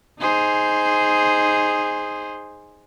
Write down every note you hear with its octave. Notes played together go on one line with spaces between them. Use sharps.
D#4 G#4 C5